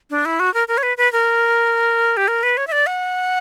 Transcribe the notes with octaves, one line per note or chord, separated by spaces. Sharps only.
D4
E4
F#4
A#4
A#4
C#5
B4
B4
A#4
G4
A#4
B4
C#5
E5
D5
F#5